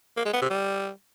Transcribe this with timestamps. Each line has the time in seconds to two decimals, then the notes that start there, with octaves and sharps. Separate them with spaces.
0.17 A#3
0.25 G#3
0.33 B3
0.42 C3
0.50 G3